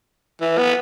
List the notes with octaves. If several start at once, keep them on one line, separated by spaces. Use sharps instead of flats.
E3
B3